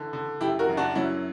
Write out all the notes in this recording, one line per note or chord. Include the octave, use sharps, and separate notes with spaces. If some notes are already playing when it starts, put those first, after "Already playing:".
Already playing: D3 E3
D3
F#2 E4 G4
F#4 A#4
F#2
D4 F#4
F#3 C#4 E4